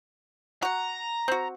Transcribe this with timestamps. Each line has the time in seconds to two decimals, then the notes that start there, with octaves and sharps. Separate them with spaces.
0.62 F#4 F#5 A#5
1.28 C4 F#4